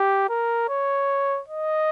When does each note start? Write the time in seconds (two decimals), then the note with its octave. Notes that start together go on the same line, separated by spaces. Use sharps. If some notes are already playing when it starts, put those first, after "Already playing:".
Already playing: G4
0.29 A#4
0.69 C#5
1.48 D#5